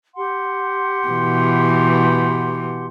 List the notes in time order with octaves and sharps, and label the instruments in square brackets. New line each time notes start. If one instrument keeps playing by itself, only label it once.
[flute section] G4 F#5 C6
[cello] B2 E3